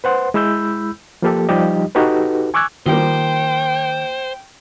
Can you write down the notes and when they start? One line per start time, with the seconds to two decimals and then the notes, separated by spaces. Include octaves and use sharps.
0.04 B4 C5 F#5 C6
0.34 G#3 E4 B5 E6 G6
1.22 F3 A#3 G4 A4
1.49 F3 G3 D#4 G4 D#5
1.95 D#4 F#4 G4 A4 B4
2.54 G#5 C#6 D6 E6 F#6 G#6
2.86 D#3 F3 G3 A#3 C5 G5